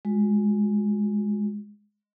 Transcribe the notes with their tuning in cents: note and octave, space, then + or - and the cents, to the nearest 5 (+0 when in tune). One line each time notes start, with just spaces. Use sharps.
G#3 +0 F#4 -45